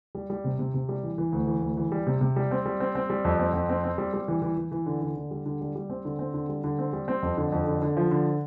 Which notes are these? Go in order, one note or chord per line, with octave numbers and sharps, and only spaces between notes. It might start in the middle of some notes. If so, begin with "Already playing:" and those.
G3
G3
C3
C3
C3
G3
E3
E3
D2
E3
D2
E3
G3
C3
C3
G3
C4
G3
C4
C4
G3
F2
C4
F2
C4
C4
G3
G3
E3
E3
E3
E3
D3
D3
D3
G3
D3
G3
G3
C4
D3
C4
D3
G3
D3
C4
G3
C4
F2
D3
F2
D3
D3
F3
D3